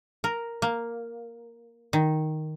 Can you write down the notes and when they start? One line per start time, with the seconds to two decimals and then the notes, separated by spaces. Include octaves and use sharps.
0.24 A#4
0.62 A#3
1.93 D#3